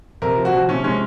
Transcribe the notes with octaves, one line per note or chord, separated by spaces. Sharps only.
C3 A#4
F3
F#4
F3
C3 C#4
G#3 C#4